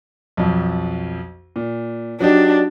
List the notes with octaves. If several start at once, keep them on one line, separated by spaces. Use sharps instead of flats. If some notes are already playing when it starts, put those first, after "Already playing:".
B1 F2
A#2
F#3 D4 D#4 G4